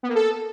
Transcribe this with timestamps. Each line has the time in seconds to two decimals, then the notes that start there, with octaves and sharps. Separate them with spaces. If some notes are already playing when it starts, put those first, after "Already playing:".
0.03 B3
0.09 A#3
0.15 A4